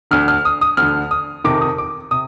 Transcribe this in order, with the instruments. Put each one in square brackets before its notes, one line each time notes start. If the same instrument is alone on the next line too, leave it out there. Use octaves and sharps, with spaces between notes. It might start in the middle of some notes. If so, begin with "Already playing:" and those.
[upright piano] D2 D3 F6
F6
D#6
D#6
D2 D3 F6
D#6
F2 C3 D#3 D6
D#6
D6
C3 D#6